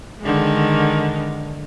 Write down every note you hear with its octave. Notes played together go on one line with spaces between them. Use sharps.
D3 D#3 G#3